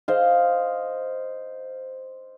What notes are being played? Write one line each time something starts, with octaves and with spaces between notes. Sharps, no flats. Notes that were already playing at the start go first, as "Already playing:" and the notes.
C5 D#5 F5